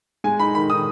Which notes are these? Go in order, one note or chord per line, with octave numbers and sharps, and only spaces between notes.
G#3 G#5
D#4 B5
D#3 B5
D#3 D#6